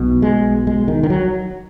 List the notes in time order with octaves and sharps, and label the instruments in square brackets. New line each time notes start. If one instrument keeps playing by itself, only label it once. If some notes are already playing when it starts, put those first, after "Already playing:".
Already playing: [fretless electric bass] B1 B2
G#3
G#3
D#3
D#3
F#3